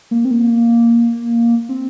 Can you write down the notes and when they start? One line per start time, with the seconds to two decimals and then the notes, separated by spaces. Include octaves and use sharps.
0.11 A#3
0.25 C4
0.31 A#3
1.69 C4